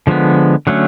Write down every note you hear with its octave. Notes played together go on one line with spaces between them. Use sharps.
D3 F3 G#3 B3
D3 F#3 A3 C#4